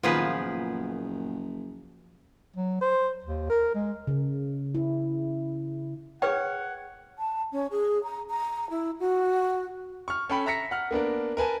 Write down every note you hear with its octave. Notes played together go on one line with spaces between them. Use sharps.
F#1 A#2 D#3 F3 B3 G#4 B4
F#3
C5
D#2
A#4
G#3
C#3
E4
G#4 B4 C#5 F#5 G5
A5
C#4
G#4
A#5
A#5
E4
F#4
C#6 F6
C#4 A4 G5 B5
E5 A#5 A#6 B6 C#7
F#5 F6
A#3 B3 D4 A#4
A#4 B4 G#5 A5